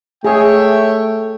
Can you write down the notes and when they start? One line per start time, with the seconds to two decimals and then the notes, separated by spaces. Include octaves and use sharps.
0.25 A3 G#4 C#5 E5 G5